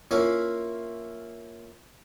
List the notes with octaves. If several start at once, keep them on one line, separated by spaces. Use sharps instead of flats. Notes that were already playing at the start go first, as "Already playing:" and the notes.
A#3 C#4 E4 F4